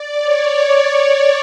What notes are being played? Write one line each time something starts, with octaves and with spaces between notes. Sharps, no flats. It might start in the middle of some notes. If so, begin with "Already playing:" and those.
Already playing: D5
C#5